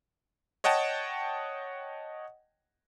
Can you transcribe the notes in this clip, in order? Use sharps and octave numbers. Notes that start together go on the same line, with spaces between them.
C#5 D#5 F#5 G5 A5